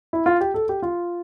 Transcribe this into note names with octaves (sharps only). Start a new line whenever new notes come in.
E4
F4
G4
A4
G4
F4